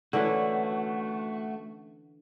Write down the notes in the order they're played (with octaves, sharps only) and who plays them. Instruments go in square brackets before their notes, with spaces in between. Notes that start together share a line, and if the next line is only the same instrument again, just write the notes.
[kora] D3 E3 C#4 [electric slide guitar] A3 F#4